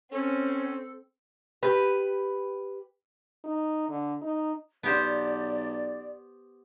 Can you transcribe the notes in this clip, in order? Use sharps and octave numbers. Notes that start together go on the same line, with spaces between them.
C4 C#4 A4
G4 B4
D#4
D3
D#4
B1 B3 G4 C5 D5